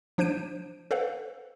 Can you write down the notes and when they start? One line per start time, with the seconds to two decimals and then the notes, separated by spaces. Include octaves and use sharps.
0.18 F3 D4 C5 G6 D7 D#7
0.91 A4 B4 C5 F5 F#5